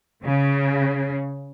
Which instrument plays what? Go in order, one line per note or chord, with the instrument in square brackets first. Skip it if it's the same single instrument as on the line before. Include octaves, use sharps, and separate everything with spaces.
[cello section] C#3